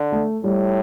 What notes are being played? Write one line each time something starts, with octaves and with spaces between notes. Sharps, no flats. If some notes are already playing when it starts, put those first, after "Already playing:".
Already playing: D3
A3
A2 G3